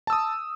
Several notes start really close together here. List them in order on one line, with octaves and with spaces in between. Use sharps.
A5 E6 D#6